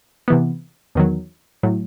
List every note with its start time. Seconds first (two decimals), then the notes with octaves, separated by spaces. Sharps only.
0.28 C3 E3 B3
0.95 E2 D#3 F#3
1.63 A2 F#3